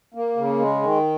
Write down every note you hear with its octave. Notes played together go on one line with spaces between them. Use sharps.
A#3
C#3
G#3
D#3